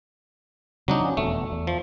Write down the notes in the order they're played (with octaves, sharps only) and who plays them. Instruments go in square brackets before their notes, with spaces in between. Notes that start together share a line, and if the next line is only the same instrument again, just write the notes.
[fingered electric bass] C#3 G3 C4 [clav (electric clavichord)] F#3 D4 D#4
[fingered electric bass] F3 B3 C#4
[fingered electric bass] F1 E2 B2 [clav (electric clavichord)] A3
[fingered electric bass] E2
[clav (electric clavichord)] F3